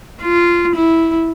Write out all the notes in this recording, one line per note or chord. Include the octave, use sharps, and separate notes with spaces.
F4
E4